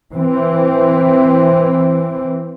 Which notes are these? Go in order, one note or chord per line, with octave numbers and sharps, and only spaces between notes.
E3 C4